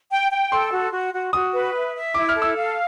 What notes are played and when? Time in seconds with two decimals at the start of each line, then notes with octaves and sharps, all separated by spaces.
0.11 G5
0.31 G5
0.52 A4 C6
0.72 F#4
0.92 F#4
1.13 F#4
1.33 F#4 D#6
1.54 B4
1.75 E5
1.95 E5
2.14 E4 D6
2.29 F6
2.36 A4
2.42 E6
2.56 F5